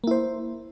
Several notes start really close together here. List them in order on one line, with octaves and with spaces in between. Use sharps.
A#3 E4 C5